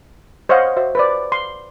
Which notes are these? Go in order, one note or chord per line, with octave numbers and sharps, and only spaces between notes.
C5 C#5 D#5 F5 F#5
F#4 C5 E5
B4 C5 D5
C6